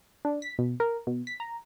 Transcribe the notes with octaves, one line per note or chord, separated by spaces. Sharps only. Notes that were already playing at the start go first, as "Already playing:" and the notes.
D4
B6
B2
A#4
B2
B6
A#5